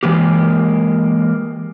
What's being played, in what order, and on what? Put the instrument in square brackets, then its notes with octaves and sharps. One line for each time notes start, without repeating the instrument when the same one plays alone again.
[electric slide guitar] E3 G#3 A#3 G4